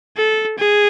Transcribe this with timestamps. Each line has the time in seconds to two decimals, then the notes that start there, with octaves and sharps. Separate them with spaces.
0.17 A4
0.58 G#4